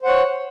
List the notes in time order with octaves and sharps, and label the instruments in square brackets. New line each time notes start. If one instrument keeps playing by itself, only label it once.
[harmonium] C5
F#5
C#5